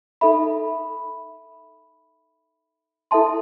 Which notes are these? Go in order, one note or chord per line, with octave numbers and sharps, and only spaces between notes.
D#4 A4 E5 B5
E4 A4 E5 A5 C6